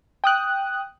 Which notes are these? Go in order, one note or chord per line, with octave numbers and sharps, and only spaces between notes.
G5 D#6 F#6